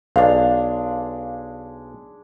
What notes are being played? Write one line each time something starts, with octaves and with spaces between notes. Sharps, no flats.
B1 G#3 D4 F5